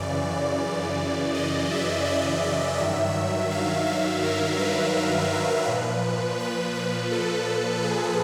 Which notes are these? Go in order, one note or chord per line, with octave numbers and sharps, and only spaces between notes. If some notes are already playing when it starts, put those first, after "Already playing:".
Already playing: F#2 C#3 E3 D5
D#5
E5
D5
D#5
G2 D#3 F#3 E5
F5
E5
A#4
B4
A#2 F3
B4
B4
A4
G#4